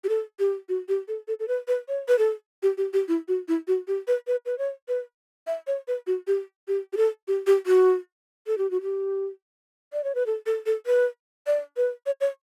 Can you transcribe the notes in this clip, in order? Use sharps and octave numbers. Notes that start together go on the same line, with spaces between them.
G4
A4
G4
F#4
G4
A4
A4
A4
B4
B4
C#5
B4
A4
G4
G4
G4
E4
F#4
E4
F#4
G4
B4
B4
B4
C#5
B4
E5
C#5
B4
F#4
G4
G4
G4
A4
G4
G4
F#4
A4
G4
F#4
G4
D5
C#5
B4
A4
A4
A4
B4
D5
B4
C#5
C#5